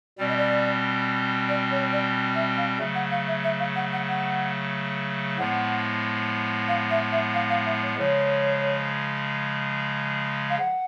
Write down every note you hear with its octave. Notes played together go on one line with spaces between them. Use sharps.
B2 G3 C4 D5
D#5
D5
D5
C#5
D5
E5
F5
C#3 F#3 A3 E5
F#5
F5
E5
E5
F5
F#5
F#5
F#5
A2 F3 G#3 B3 F#5
F5
E5
E5
F5
F5
E5
C#5
C#3 F3 G#3 C#5
F5
F#5